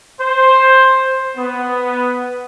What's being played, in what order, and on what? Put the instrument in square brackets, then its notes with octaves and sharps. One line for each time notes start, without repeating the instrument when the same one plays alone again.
[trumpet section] C5
B3